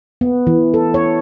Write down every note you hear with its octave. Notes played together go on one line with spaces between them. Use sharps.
B3
E3
A4
C#5